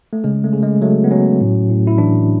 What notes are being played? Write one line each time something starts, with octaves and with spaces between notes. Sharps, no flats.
A3
C#3 G#3
A3
C#3
G#3
F#3 A3
B3
F#3 C#4
A2
A2
E4
E3 D4